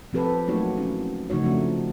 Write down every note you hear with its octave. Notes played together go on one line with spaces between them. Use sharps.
F3 C4 G4 A4 B4
F#3 A3 A#3 D#4 F#4 C#5
C#4 E4
C#3 F3 A3 D#4 F#4 C#5
F3 A3 C4 D4